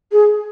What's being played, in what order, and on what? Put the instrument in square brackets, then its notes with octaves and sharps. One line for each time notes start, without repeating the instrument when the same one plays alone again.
[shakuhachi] G#4